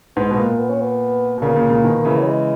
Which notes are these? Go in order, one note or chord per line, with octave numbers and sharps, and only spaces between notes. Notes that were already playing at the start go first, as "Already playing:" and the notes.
G#2 B3
B2 B3
A#2 A#3
B3
C#4
B3
B2
A#2 C#3 A#3
A#2 C#3
A#2 C#3
B2 D#3
C#3 E3
F#3
G#3